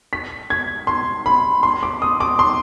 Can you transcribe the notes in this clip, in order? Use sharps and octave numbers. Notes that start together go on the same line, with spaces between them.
B6
G#6
C6
B5
C6
D6
D#6
D6
C6